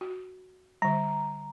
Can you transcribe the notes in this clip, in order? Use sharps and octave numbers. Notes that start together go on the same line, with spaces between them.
F#4
D3 G3 A#5